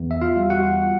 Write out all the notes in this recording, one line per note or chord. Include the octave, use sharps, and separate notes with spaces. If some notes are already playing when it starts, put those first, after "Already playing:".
Already playing: E2
E5
F4 F5
G3
F#4 F#5